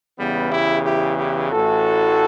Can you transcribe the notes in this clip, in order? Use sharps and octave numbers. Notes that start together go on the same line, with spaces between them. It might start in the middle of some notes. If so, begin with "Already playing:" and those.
E2 C#3 E3 G3 B3
E4 G4
E4 G4
E4 G4
A1 A2 E3 F#4 A4